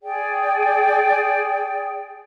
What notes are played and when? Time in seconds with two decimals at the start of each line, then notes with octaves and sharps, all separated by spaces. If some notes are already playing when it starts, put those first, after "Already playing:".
0.03 G#4 D5 G5